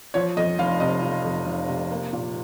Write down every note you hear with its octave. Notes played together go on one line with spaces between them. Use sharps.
F3 C#5
F2 D#5
F1 F5
C3 D#5
F3
F2
F1
C3
A#3
A#2